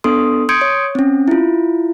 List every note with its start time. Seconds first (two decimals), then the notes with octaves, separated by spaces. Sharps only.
0.04 B3 D4 A4 C6 D#6
0.49 C6 D#6 G6 G#6 C#7 D7
0.61 C#5
0.95 C4 C#4
1.28 E4 F4